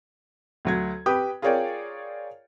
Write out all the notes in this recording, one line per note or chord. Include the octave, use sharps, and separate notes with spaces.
D2 F#3 G#6
G4 B4 G5 D#6
F4 G#4 A#4 C#5 D5 G5